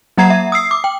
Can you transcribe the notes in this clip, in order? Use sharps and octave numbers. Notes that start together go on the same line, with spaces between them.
F#3 A#3 F#5 A#5 G#6 C7
E5
D#6 E6 C7
D6
G5